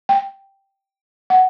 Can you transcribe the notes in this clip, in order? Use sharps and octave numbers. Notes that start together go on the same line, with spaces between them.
G5
F#5